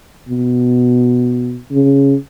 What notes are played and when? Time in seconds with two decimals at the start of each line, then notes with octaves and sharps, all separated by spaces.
0.29 B2
1.72 C#3